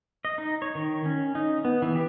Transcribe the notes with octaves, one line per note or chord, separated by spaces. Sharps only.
D#5
D#4
C#5
D#3
C#4
D#4
B3
E3
G4